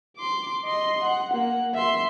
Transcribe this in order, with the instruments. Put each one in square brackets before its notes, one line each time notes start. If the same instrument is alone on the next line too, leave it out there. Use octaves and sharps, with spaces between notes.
[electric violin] C6 D6
D#5 C6
F#5
A#3 F#5
E5 C6